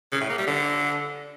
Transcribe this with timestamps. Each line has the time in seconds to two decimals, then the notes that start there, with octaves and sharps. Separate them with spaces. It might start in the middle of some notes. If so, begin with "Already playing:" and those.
0.12 C#3
0.21 A2
0.30 A#3
0.38 G3
0.47 D3